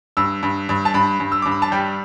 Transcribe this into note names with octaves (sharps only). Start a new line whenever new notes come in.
G2 E6
G2
G2
A5
G2 B5
G2
E6
G2 D6
B5
A5
G3 G5